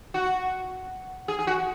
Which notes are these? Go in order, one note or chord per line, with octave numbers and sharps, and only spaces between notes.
F#4
G#4
G#4
F#4